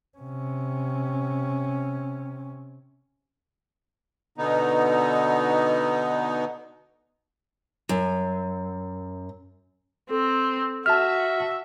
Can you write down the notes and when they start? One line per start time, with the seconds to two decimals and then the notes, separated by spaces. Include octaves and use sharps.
0.18 C3 C#4
4.38 B2 D3 B3 D#4
7.89 F#2
10.10 C4 A4
10.86 F#4 E5 A5 F6